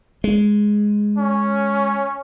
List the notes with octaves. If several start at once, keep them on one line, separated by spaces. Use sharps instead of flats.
G#3
C#4